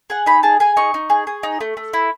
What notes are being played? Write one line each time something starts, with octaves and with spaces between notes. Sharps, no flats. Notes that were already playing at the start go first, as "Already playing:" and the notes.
G#4 F#5
D#4 B5
G#4 A5
G#4 G#5
D#4 C#6
D#4
G#4
G#4
D#4
A3
A3
E4